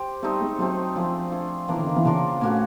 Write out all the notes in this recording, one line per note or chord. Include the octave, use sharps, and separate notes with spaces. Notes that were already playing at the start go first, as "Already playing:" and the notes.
Already playing: G4 C5
G3 A3 C4 D#4
G#3
F#3 A3 C4 D#4
F3 A3 D4 F4 G#4
A3 D4 F4 G#4
E3 A#3 D4 F4 A#4
D3
D#3
E3
C#3 A#3 D4 F4 A#4
A2 A#3 C#4 F#4